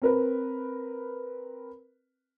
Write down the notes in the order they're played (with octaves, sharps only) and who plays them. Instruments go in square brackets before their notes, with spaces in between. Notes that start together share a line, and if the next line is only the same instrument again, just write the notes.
[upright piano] C4 A#4 B4